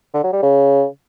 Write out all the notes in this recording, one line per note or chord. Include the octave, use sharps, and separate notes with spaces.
D3
F#3
G3
C#3